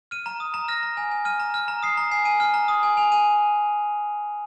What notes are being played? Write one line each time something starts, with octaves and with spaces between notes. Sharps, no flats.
F6 D#7
A#5
D#6
A#5
F6 A#6
A#5
G#5
G#5
F6 D#7
A#5
F6
A#5
D#6 C7
A#5
G#5 C7
G#5 D#7
F6
A#5
D#6
G#5
G#5 F7
G#5 D#7